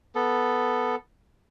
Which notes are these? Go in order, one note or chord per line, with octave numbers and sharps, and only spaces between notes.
B3 A4